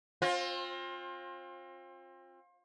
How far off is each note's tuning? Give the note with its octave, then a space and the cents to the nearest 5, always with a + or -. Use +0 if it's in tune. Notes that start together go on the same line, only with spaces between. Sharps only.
C4 +35 F4 +25